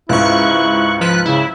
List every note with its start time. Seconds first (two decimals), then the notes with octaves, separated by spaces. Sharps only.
0.09 C#2 G#2 E4 C#6 F#6
1.01 F3 B4 F#6
1.25 C#3 E4